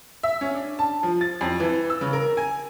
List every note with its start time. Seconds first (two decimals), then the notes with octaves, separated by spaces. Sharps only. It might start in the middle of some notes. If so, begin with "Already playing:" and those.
0.23 E5
0.41 C#4
0.54 D4
0.79 A5
1.03 F3
1.21 A6
1.41 F2
1.60 E3
1.90 E6
2.01 C#3
2.13 A#4
2.37 G#5